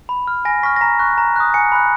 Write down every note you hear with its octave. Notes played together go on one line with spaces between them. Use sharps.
B5
F6
G#5 A#6
C#6 F6 B6
A#6
A#5 B6
C#6 F#6
A#5
D#6 F#6
G#5 C#7
B5 F#6